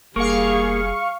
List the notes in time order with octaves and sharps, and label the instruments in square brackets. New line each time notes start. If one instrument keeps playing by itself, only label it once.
[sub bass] F1 [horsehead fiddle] G3 G#4 [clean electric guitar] A#3 [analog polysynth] F5 C#6